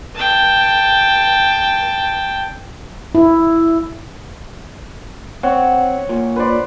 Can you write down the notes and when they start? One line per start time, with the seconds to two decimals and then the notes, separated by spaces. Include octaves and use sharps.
0.15 G5 A5
3.15 E4
5.43 C4 C#5 F#5
6.09 A#2
6.36 B4 C5 D5